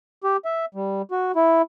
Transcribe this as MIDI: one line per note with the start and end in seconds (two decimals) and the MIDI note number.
0.24 0.37 67
0.45 0.65 76
0.74 1.02 55
1.11 1.32 66
1.36 1.62 64